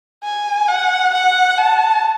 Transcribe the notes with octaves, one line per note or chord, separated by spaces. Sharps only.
G#5
F#5
F#5
A5